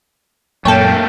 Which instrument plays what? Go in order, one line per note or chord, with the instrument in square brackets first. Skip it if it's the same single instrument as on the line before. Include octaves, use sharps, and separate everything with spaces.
[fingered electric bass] F#2 A#2 [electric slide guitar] A3 A#3 [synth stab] A4 C#5 [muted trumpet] G5